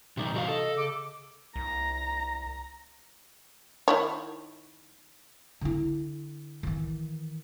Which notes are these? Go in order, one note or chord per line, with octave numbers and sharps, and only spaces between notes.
C3 E3 G3 D#4
C3 F#4 F5
A4 D#5
C#3 D6
C2 A#5
D#3 E4 C#5
D3 E4
D#3 E3